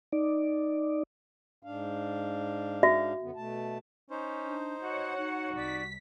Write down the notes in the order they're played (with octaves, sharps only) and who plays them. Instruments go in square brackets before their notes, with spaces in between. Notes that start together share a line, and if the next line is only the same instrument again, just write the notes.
[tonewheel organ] D#4 D5
[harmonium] G#2 D4 F5
[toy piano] F#4 E5
[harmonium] F#2 D3 B3
B2 A3 A5
[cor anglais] C#4 [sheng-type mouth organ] D#4 C5
[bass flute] D4
[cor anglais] F#4 [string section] C#5 F#5 [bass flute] D#5
[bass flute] D#4
[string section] C2 B6 [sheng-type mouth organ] D5